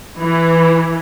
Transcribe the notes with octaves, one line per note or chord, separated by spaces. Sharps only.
E3